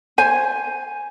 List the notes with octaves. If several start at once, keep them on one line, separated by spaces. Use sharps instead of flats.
C5 G#5